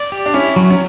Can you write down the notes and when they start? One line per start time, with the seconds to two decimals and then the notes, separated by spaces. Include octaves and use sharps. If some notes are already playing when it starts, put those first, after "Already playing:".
Already playing: D5
0.12 G4
0.26 D4
0.34 C#4 E4
0.56 F#3
0.70 C#4